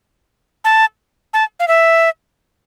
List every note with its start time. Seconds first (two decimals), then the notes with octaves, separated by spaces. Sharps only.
0.65 A5
1.34 A5
1.60 F5
1.68 E5